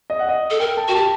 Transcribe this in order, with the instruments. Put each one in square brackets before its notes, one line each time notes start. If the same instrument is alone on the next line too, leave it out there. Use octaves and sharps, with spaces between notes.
[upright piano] D#5
F#5
D#5
[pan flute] A4
[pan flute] A#4 [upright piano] G5
[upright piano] A5
[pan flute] F#4 [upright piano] G5
[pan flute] G4 [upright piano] A5